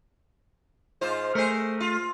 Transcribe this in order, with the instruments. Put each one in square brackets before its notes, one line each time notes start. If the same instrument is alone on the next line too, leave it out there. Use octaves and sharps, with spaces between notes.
[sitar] G#2 F4 C5
[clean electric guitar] A3 G#4 [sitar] A#4 C5
[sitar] F4